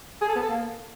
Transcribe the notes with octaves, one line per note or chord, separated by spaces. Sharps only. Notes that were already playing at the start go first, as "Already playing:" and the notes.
G#4
A4
B3
A4
A#3